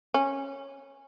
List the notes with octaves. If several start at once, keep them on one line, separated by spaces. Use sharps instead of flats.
C#4